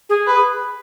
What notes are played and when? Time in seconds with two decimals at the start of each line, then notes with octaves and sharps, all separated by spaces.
0.09 G#4
0.27 B4